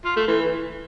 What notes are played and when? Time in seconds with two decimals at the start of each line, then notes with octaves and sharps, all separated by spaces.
0.05 F4
0.16 A3
0.28 E3